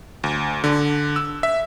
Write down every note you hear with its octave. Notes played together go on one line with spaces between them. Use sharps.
D2
D3
E6
E5